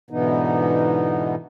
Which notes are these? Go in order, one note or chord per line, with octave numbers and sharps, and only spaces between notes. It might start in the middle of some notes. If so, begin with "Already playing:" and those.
G#2 B2 D3 E3 B3 D#4